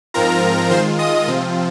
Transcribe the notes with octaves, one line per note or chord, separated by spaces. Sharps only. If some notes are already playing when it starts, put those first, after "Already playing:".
G#2 F3 C4 F4 A#4 A#5
D#3 G#3 F4 C5 C6
D#5 D#6
C3 F3 C4 F4